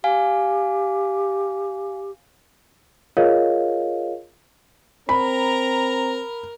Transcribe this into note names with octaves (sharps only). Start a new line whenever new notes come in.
G4 F5 G#5
F4 G#4 A#4 C#5 D#5 F5
C4 A#4 A#5 B5